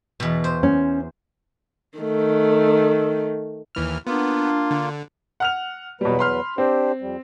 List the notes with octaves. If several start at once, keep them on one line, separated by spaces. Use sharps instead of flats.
E2 B2
C5
C#4
D#3 A3
D#2 E3 F6
A#3 B3 D4 F4
D3
F#5 F6 F7
E2 B2 F#3 G3 B4
B5 C6 F6
C4 D4 G4 C5
F2 G3